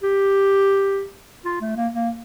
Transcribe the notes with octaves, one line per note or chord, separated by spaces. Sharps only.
G4
F4
A3
A#3
A#3